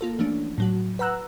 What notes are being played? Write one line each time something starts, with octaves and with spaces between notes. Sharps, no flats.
A#3 F4 A4
E3 F3 A3 C#4 D4
A2 F#3 F#4
B4 F#5 A#5 E6 F#6